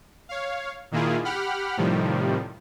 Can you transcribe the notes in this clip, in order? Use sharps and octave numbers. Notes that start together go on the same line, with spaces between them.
C#5 F5
A#2 D#3 A#3 E4 F4 G#4
G4 F#5 B5 F6
A2 C3 D#3 F3 G3